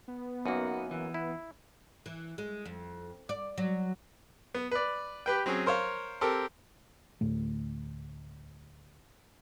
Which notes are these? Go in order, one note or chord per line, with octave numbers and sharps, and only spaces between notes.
B3
F#2 A#3 D#4 F#4
E3
E4
E3
G#3
F2
D5
F#3
B3
B4 D5
G4 B4 G5
F#3 C4 C#4 G#4
A#4 C5 C#5 F5
C4 G4 A4 A#4
D2 A2 A3